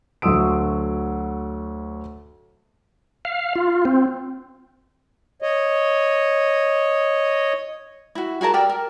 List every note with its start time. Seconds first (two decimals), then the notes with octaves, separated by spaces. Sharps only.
0.22 D2 F#3 C6 D#6 E6 D7
3.25 F5
3.56 F4
3.85 C4
5.42 C#5 D#5
8.15 E4 F#4
8.41 F#4 G#4 A#4 A5
8.54 G4 A4 A#4 D5
8.69 A#4